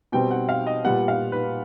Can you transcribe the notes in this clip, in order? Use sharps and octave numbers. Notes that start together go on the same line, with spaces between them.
B2 G3 C4 G5
F#5
F5
D#5
A#2 G3 B3 F#5
F5
B4